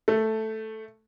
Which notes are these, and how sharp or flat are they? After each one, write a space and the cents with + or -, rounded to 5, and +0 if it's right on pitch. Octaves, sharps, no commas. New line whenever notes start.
A3 +0 A4 +0